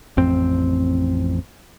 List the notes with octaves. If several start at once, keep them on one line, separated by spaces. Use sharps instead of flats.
A1 F2 C4